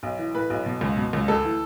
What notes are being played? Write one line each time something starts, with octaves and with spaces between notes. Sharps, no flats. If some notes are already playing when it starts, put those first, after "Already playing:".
B1
E3
A2 B4
B1
B2
C#2
B2
C#2
D2 A4
E3